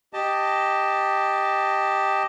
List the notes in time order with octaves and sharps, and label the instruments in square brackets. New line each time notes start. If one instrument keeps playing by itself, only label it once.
[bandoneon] G4 D#5 A5